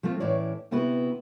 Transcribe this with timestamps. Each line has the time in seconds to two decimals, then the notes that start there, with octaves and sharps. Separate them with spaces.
0.03 F3 A3 C4 F4
0.20 A2 E3 C#4 E4 C#5 D5
0.71 D2 C3 B3 E4 F#4 B4